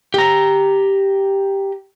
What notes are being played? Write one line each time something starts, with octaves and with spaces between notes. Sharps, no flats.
G4 A#5